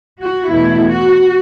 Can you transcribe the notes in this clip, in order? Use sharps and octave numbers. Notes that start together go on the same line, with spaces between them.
F#4
E2 B2 A3 E4
F#4